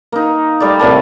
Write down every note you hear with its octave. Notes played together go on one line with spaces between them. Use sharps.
A#3 D#4
G3 A3 D5
A2 C3 A#3 A5